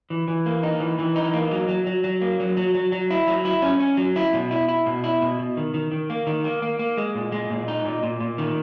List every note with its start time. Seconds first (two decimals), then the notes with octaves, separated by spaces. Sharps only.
0.10 E3
0.28 E3
0.46 A#3
0.63 D#4
0.80 E3
0.99 E3
1.16 D#4
1.34 A#3
1.51 F#3
1.69 F#3
1.87 F#3
2.04 F#3
2.22 A#3
2.40 F#3
2.57 F#3
2.75 F#3
2.92 F#3
3.11 E4
3.28 F#3
3.45 E4
3.62 C#4
3.80 C#4
3.97 F#3
4.16 E4
4.33 B2
4.51 E4
4.69 E4
4.86 B2
5.04 E4
5.22 B2
5.39 B2
5.57 D#3
5.74 D#3
5.92 D#3
6.10 A#3
6.27 D#3
6.44 A#3
6.62 A#3
6.79 A#3
6.97 G#3
7.15 A#2
7.32 G#3
7.50 A#2
7.68 D#4
7.85 A#2
8.03 A#2
8.20 A#2
8.38 D#3